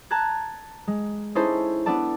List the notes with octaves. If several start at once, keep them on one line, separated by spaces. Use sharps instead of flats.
A5 A#5 F#6 G#6
G#3
C#4 D#4 E4 G#4 A4 C5
B3 D4 A4 D5 A5